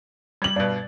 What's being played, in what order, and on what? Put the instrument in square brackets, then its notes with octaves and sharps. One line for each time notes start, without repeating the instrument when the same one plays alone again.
[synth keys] G3 [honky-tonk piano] G#6 F#7
[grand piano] G2 B2 [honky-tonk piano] D5